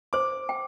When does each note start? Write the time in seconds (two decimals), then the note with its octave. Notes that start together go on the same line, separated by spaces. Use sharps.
0.13 C5 D6
0.49 G5